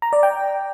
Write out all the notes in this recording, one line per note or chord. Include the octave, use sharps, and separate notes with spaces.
A#5
D5
G5